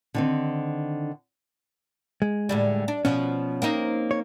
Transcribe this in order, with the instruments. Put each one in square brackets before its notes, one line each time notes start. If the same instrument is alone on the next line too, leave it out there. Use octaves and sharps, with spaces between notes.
[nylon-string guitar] D3 D#3 C4
[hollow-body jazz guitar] G#3
[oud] A2 D3 G3
D4
[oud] B2 F3 [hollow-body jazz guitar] C#4
[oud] A#3 C4 D#4
[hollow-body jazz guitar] C#5